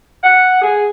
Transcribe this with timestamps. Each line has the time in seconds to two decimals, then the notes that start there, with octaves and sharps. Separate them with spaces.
0.24 F#5
0.62 G#4